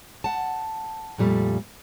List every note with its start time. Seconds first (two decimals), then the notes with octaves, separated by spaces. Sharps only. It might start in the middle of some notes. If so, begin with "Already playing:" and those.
0.24 F#5 A5
1.18 F2 A#2 G3 A3